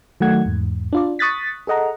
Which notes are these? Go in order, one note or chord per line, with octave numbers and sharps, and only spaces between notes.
D#3 F#3 A3 F#5 G#6
E2 G#2
D4 F4 D5
C#6 D#6 F#6 A6 B6
G#4 A4 D#5 F#5 A#5